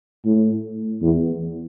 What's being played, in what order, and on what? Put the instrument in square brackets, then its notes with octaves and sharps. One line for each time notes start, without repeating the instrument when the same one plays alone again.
[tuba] A2
E2